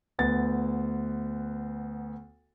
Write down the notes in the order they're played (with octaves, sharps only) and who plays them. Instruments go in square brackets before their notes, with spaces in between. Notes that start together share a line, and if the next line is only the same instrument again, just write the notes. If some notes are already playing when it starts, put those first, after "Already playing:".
[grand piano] D2 B3 A6